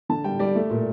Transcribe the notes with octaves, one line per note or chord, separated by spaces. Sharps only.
D3 A5
G3 G5
G3 D5
A3
A#2